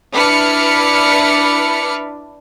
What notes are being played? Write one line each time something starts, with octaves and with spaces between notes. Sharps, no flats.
D4 E4 B4 F6 C#7